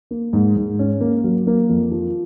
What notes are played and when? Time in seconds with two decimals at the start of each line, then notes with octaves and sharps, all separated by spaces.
0.11 A#3
0.33 G#2
0.56 G#2
0.79 C#4
1.01 A#3
1.24 F#3
1.47 A#3
1.69 F2
1.92 F3